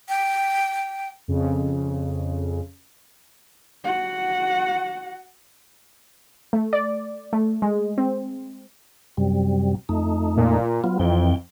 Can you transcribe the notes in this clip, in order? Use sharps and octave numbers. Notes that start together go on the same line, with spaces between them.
G5
F2 C#3
F#4 F#5
A3
D5
A3
G#3
C4
F#2 C3 G3
F2 A3 D#4
A#2
F#3 B3 F4
F2 E3 G5